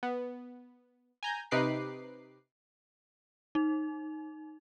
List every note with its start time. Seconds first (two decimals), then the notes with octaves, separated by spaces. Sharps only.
0.03 B3
1.23 G#5 A#5 G6
1.51 C3 D#4 B4 D6 F#6 C7
3.55 D#4